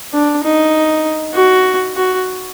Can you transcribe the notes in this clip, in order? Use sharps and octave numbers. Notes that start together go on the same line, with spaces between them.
D4
D#4
F#4
F#4